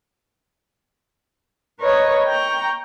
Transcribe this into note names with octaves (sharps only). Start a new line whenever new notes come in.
A#4 B4 C#5 D#5
G5 A#5 C#6